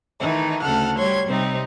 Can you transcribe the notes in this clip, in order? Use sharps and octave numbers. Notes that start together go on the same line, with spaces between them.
D#3 E3 A3 D#4
D2 C#3 A4 F#5 F6
G3 C#5 C6 G#6
C3 G3 C4 D#4